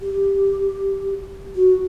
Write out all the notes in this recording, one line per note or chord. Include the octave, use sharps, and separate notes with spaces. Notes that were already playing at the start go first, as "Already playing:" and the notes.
G4
F#4